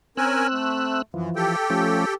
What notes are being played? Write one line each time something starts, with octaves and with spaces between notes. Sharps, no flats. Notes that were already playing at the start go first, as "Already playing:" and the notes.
C4 C#4 A#4 G#5 E6 F#6
A3
F#2 E3 F3
G4 A4 G5
F3 A3 C#4